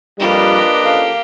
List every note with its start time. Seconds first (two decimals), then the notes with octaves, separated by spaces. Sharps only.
0.20 F2 G3 A#3 D4 F4 G4 B4 D#5
0.84 C#4 F4 A4 F5